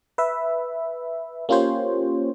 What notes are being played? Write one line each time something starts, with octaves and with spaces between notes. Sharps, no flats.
B4 E5
A#3 C#4 F4 G4 C5 C#5